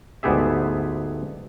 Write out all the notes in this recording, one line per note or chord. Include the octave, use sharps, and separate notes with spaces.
D2 G#2 B3 G4 G#4 E5